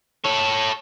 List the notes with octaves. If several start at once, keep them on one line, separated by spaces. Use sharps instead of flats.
A4 C#5